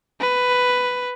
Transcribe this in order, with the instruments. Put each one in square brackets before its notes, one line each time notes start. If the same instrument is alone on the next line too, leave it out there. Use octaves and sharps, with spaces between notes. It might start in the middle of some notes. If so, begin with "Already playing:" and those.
[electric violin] B4